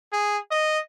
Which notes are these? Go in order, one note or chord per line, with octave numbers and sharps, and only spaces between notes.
G#4
D#5